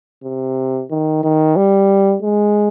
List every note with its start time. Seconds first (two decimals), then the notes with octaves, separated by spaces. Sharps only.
0.23 C3
0.90 D#3
1.23 D#3
1.56 G3
2.22 G#3